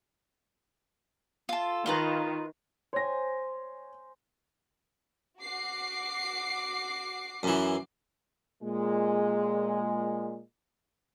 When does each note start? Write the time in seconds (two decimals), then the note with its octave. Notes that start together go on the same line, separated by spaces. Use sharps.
1.49 F4 A4
1.86 D#3 F4 B4 A#5
2.93 C5 C#5 G#5 A#6
5.40 F#4 D6 C7
7.43 F#2 E3
8.62 A#2 G#3